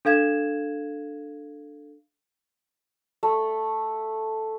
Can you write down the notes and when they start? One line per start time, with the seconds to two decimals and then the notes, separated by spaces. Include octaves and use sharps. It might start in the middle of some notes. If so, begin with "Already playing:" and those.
0.05 D4 A4 F5 G#6 E7
3.23 A3